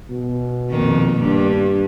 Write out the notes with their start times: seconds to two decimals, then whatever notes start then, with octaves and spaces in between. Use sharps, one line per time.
0.10 B2
0.70 F2 A#2 D#3
1.19 G2